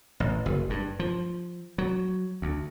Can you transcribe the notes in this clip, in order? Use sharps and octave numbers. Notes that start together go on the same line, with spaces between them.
A1
F#1
G2
F3
F#3
D2